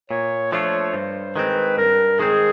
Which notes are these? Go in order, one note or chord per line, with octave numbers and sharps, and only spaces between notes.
A#2 C#5
F3 A3 D4 F4 C#5
G2 C5
D#3 G#3 C4 B4
G2 A#4
D#3 G#3 C4 G#4